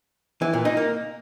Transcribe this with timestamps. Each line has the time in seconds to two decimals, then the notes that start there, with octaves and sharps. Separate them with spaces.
0.42 E3
0.53 A#2
0.65 D#4
0.77 A#3